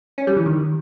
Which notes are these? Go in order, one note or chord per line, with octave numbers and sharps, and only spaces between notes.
C#4
G3
E3
D#3